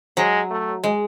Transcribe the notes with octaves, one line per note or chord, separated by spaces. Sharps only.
F#3 G#3
A3
G#3